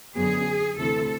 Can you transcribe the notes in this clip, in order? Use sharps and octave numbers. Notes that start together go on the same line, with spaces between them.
F#2 D3 F#3 B3 G#4
D2 C3 E3 A4